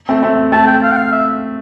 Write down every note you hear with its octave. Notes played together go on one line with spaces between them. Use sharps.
A3 C4
A3 C4
A3 C4 A5
G5
F5
G5
F5
E5